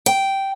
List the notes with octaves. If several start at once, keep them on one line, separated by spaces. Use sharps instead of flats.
G5